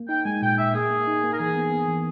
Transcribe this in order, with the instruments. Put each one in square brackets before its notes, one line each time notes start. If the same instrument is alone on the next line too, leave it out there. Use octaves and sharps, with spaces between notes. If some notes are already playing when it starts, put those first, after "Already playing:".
Already playing: [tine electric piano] A#3
[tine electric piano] D#4 [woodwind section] G5
[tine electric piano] G#3 [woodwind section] G#5
[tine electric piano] A#2 [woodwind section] G5
[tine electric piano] A#2 [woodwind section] E5
[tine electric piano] A#3 [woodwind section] G#4
[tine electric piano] A#3
D#4
A#3
[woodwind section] A#4
[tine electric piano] E3 [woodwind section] G#4
[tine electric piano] B3
B3
E3